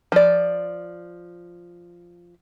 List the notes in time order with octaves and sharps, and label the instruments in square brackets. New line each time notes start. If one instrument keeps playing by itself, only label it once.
[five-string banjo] F3 D5